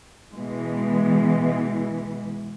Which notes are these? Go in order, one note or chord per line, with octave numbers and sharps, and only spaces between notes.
B2 E3 G#3